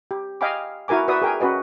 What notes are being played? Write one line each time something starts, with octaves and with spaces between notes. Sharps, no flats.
G4
D#5 F5 G5 G#5 B5 D6
E4 F#4 A#4 G#5 D6
F#4 B4 D5 E5 D#6
G#4 A#4 G5 G#5
C#4 F#4 B4 D#5